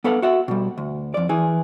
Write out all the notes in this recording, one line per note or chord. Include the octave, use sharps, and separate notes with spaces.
B3 A4 B4 F5 F#5
F#4 E5 F#5
B2 G3
D2
F2 D5
E3 G#4